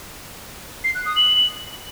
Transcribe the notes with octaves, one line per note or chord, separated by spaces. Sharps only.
C7
F#6
D#6
F#7